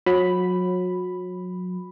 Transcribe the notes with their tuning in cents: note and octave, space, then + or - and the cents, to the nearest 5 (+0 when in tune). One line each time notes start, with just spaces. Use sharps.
F#3 -30 B5 +0